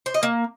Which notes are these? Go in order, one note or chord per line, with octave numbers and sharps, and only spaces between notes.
C5
D#5
A#3